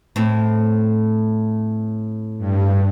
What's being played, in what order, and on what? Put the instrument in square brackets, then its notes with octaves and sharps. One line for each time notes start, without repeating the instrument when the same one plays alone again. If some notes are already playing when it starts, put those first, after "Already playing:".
[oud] A2 C4
[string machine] G2